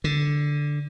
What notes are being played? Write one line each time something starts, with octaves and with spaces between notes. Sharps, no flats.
D3